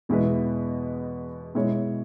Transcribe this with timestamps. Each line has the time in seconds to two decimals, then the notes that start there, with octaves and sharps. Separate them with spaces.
0.09 E2 B2 G#3 E4 B4
1.55 B2 G#3 E4 C#5